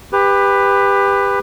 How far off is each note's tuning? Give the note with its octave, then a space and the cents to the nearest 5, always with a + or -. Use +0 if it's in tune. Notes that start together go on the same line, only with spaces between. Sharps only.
G4 +25 B4 +5